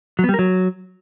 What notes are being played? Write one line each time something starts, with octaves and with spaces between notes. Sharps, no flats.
F#3
B3
G3
A#4
F#3